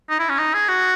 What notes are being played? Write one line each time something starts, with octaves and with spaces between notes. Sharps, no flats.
D#4
E4
C#4
D#4
G#4
F#4